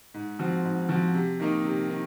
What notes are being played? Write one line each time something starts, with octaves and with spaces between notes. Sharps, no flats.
G#2
F3 C4 F#4
G#2
F3 C4 F#4
C3
D#3 A#3 D#4
C3
D#3